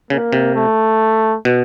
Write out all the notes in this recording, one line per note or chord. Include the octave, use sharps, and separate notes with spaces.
C#3 A#3
C3
A3
B2